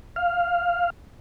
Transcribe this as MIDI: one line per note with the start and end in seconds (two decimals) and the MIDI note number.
0.16 0.90 77